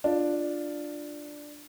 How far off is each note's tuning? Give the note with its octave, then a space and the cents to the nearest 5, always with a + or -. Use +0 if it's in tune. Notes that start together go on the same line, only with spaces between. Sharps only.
D4 +5 F4 +0